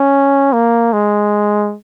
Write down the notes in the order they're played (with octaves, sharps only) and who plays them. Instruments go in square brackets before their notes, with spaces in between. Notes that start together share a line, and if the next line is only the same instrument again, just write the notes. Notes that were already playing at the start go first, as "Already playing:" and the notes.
Already playing: [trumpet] C#4
A#3
G#3